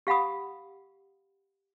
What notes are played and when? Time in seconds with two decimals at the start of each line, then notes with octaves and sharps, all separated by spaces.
0.07 G4 F5 F#5 B5 D#6